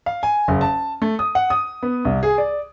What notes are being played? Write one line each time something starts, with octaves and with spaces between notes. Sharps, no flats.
F5
G#5
F#1
A5
A3
D#6
F#5
D#6
B3
C2
G#4
D5